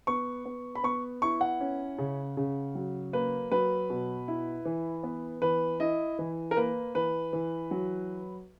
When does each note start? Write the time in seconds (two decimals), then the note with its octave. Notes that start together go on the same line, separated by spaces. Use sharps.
0.07 B3 C#6
0.46 B3
0.75 B5
0.84 B3 C#6
1.22 E4 C#6
1.41 F#5
1.60 C#4
1.98 C#3
2.37 C#3
2.75 F#3
3.13 A#3 B4
3.51 F#3 B4
3.90 B2
4.28 E4
4.65 E3
5.03 B3
5.42 E3 B4
5.80 E4 D#5
6.19 E3
6.51 A#4
6.57 A#3 B4
6.95 E3 B4
7.33 E3
7.71 F#3